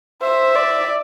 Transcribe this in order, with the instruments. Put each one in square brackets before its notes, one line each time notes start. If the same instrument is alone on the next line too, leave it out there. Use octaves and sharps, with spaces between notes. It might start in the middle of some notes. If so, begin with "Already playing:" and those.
[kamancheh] C5 [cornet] E5
[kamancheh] D5